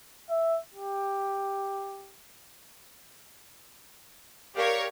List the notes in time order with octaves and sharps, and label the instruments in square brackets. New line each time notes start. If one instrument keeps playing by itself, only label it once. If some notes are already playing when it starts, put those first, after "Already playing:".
[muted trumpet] E5
G4
[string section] G4 A#4 C#5 [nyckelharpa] D5 F5